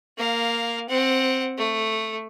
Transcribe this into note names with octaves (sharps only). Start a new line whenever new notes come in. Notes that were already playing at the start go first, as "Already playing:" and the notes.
A#3 F5
C4 F#5
A3